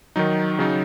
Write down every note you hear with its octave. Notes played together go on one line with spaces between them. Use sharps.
D#3 F#3 D#4
C#3 F#3 D#4